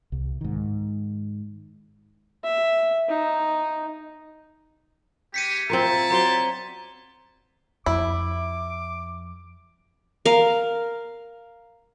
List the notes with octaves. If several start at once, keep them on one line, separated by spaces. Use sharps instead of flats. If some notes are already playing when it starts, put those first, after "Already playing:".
C2
G#2 D#3
E5
D#4
G#3 G4 B6 C#7 D#7
C4 E4 F4 A#4 E5 A5 A#5
F#3 C5 D5 A#5 G7
F2 E4 D6
A#4 F5